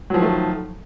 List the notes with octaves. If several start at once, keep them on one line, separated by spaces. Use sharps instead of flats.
D#3 F3 F#3 A3